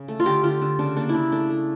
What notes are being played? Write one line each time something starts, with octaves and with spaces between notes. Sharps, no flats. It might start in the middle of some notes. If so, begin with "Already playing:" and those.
Already playing: C#3
A3
F4
D3 G4
D3 F4
D3
C#3 D4
A#3 D4
E4
C#3 D4
A3 D4
A3